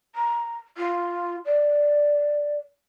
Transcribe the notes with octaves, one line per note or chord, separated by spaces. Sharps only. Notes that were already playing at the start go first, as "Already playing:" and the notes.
A#5
F4
D5